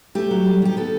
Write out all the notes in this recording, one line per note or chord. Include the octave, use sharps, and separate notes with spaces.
A3 G4
F#3
G3
D#3 G4
B3 A4